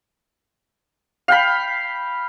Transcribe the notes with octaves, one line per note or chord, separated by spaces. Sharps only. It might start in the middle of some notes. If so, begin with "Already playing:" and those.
F5 G5 B5